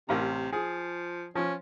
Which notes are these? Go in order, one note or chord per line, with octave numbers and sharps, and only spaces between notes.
A1 C3 A#4 A#5
F3 G#4
F3 C#4